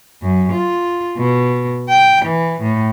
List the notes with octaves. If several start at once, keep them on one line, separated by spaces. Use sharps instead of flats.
F#2
F4
B2
G5
E3
A2